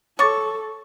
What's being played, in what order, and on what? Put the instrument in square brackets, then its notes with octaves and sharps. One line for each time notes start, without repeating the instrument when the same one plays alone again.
[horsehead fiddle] A4 [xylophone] C#5 D6 A6 [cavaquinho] C#6